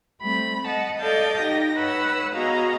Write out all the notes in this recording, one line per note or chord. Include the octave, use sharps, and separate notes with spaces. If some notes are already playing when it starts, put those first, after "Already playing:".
G3 A3 C4 B5
D#5 F#5 A5
A4 D5 D#5 F5 G6 A6
D#4 G4 A#6
B4 C#5 F#5 E6
B3 F#4 G#4 D#5 F5 A#5